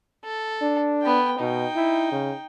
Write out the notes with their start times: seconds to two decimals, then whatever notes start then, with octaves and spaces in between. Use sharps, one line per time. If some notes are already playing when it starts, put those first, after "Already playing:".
0.24 A4
0.62 D4
1.02 B3 G5
1.40 B2 D#4 G5
1.76 E4
2.12 C#3